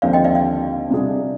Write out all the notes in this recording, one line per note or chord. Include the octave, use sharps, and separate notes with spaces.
D#2 D3 F3 C4 D5 F5
D#5 G5
D5 F5
D5 F5
C3 G3 D4 G#4